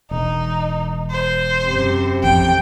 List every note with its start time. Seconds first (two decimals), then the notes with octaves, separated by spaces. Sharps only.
0.11 E1 D#4
1.11 C5
1.66 F#2 C3
2.23 A1 F2 G5